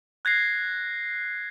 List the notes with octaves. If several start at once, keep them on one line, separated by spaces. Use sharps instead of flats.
F#6 G#6 A#6 C7